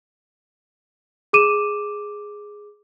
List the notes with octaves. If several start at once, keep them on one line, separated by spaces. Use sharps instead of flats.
G#4 D6 D#7 E7